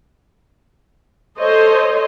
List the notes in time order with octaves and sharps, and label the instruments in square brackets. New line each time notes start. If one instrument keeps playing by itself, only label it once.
[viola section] A4 C5 C#5 D#5